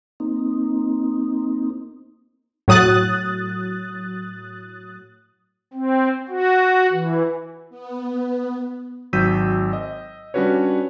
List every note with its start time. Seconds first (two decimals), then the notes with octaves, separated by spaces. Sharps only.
0.20 A#3 C4 D#4
2.68 A2 F#3 D#6 F#6 A6
5.74 C4
6.28 F#4
6.92 E3
7.70 B3
9.13 G#1 F#3 E6 G6 B6 D#7
9.73 D#5
10.34 G3 C#4 D4 F#4 B4 C#5